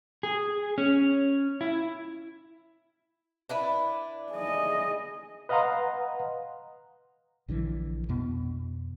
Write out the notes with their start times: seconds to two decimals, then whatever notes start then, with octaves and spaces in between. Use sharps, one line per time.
0.23 G#4
0.78 C#4
1.61 E4
3.49 D4 E4 B4
4.33 G#4 D#5
5.49 B4 D#5 F5 F#5 A#5 C6
7.48 A#1 D3 E3 F3
8.09 F2 B2 B3